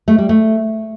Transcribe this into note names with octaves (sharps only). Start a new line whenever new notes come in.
A3
G3
A3